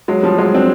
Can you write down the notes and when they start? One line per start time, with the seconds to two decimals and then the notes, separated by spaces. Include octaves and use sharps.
0.08 F#3 G#3
0.23 F3 G3
0.38 F#3 G#3
0.54 C4 D4